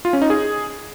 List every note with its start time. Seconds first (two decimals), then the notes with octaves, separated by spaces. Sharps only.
0.05 F4
0.13 C#4
0.22 D#4
0.30 G#4